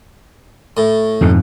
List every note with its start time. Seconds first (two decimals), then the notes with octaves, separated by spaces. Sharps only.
0.77 A2
1.21 F2 G#2 B2